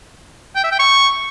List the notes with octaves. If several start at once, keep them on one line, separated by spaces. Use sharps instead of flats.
G5
E5
G5
C#6